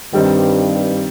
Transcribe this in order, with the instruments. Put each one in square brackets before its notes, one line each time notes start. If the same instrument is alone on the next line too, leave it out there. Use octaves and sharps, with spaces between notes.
[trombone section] G2 [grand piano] D#3 G3 C4 D#4